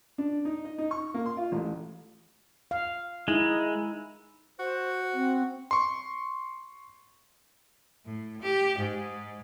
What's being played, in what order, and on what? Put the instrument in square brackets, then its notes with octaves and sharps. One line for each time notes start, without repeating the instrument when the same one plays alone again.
[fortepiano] D4
D#4
D#5
D#4
C#6
A#3
C6
F4
A1
[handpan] F5
[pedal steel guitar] G#3 [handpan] D#4 E4
[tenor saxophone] F#4 [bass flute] C5
[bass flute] C4
[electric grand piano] C6 C#6
[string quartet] A2
G4
G#2